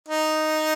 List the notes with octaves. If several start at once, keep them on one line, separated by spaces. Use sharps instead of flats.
D#4